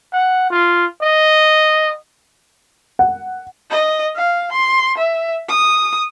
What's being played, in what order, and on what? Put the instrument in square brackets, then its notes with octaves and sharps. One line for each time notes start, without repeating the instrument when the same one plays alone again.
[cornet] F#5
F4
D#5
[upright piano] F#5
[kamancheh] D#5
F5
C6
E5
D#6